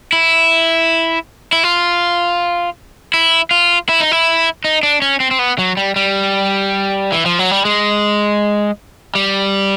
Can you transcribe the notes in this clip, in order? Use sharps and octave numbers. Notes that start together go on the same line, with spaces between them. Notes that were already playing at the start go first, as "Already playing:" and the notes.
E4
E4
F4
E4
F4
E4
D#4
E4
D#4
D4
C#4
C4
C4
B3
F#3
G3
G3
E3
F3
F#3
G3
G#3
G3